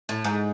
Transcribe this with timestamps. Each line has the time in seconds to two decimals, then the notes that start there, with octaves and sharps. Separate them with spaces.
0.09 A2
0.24 G#2